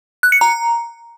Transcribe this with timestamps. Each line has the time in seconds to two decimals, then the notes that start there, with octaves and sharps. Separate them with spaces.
0.23 F#6
0.32 C#7
0.41 A#5